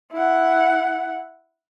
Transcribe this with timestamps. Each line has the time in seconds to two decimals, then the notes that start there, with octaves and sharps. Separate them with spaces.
0.13 E4 F#5